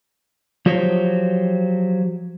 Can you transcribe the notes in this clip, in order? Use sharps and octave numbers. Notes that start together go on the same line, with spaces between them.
F3 F#3 G4 C5 C#5